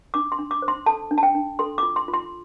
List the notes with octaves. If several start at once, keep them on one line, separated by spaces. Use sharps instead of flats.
D4 D6
C6
D4
D6
C5
C6
A4 A5
D4
A5
G5
D4
A4 C6
F4 D6
C6
F4
C6